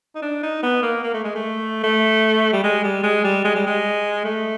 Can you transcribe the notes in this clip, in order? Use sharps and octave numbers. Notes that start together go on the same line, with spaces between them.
D#4
D4
D#4
B3
A#3
A#3
A3
G#3
A3
A3
G3
G#3
G3
G#3
G3
G#3
G3
G#3
A3